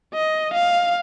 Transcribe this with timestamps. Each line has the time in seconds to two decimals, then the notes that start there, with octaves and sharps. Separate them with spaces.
0.14 D#5
0.54 F5